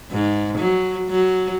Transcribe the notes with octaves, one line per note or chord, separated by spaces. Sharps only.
G#2
F#3
F#3